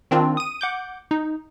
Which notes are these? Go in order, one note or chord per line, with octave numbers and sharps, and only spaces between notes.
D#3 C4 D4 F4
D#6 D#7
F#5 D6 G6
D#4